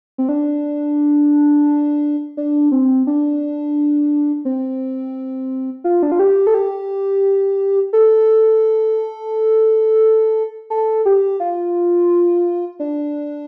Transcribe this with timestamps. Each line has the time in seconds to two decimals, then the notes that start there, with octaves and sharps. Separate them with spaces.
0.18 C4
0.29 D4
2.37 D4
2.72 C4
3.07 D4
4.45 C4
5.84 F4
6.03 D4
6.12 F4
6.19 G4
6.47 A4
6.54 G4
7.93 A4
10.70 A4
11.05 G4
11.40 F4
12.80 D4